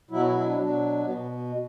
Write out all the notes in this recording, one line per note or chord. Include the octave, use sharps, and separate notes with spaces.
B2 F#3 E4
E4
D4
B2 F#3 D4
B2 B3